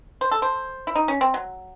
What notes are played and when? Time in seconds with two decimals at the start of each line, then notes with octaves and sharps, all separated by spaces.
0.21 C5
0.31 A4
0.42 C5
0.87 E4
0.96 D#4
1.08 C#4
1.21 C4
1.34 F#3